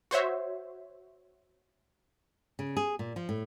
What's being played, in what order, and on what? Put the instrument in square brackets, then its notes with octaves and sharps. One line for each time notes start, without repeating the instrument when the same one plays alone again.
[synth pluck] F#4 C5 C#5 E5
[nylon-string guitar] C#3
G#4
A#2
F3
A2